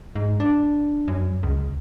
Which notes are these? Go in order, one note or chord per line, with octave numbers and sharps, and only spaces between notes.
G#2
D4
F#2
C#2